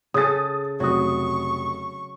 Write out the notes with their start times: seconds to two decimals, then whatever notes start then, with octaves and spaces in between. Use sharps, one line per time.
0.14 C#3 G#4 A4 D#6 A6
0.80 F1 F#3 F#4 C#6 D#6